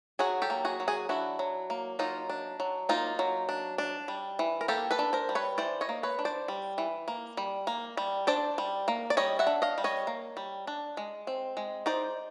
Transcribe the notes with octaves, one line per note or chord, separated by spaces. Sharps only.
F#3 F#4 G#4
G4 A4
A#3
F#4 G#4
F#3
F#4 G#4
D4 E4 F#4
F#3
A#3
F#3 D#4 F4
D4
F#3
A#3 D#4 F4
F#3
D4
D4
G3
E3
A#4
A#3 G4 A4
A4 B4
D4
A#4 C5
G3
B4 C#5
E3 C5 D5
C#5 D#5
A#3
B4 C#5
D4
C5 D5
G3
E3
A#3
G3
A#3
G3
D4 C5 D5
G3
A#3
D5
G3 C#5 D#5
E5 F#5
D4
D#5 F5
G3
C#5 D#5
A#3
G3
D4
G#3
C4
G#3
D#4 C5 D5